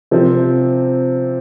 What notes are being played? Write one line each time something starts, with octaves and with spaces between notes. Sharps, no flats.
C3 F3 C4